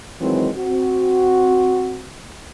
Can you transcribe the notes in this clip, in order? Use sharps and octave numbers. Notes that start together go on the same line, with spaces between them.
D#3 E3 F#3 G#3 C4
C4 F#4